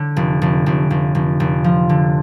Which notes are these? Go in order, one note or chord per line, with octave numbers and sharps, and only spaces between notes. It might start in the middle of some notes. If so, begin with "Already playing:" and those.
Already playing: D3
F1
F1
F1
F1
F1
F1
F3
D3